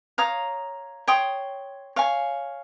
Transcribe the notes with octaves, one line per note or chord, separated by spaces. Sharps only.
C#5 F5 A#5 D#6
C#5 G5 C6 D#6
C#5 F5 G#5